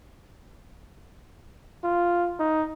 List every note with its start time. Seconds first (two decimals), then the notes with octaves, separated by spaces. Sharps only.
1.84 F4
2.39 D#4